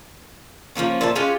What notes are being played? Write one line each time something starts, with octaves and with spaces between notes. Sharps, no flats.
F3 F#3 A#3 C#4
A#2 A#3 E5 A5
G#3 C#4 F4 G4